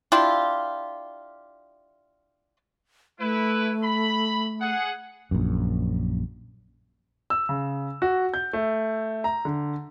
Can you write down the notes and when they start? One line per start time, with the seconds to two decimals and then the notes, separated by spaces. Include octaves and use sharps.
0.12 D4 E4 F4 G4
3.20 A3 E4 B4
3.84 B5
4.61 G#4 F#5
5.31 A#1 F#2
7.30 E6
7.49 C#3
8.02 F#4
8.34 G6
8.53 A3
9.24 A#5
9.45 D3